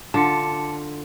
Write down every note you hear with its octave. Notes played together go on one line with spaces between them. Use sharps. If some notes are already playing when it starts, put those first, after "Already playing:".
D3 F4 A5 D6 C#7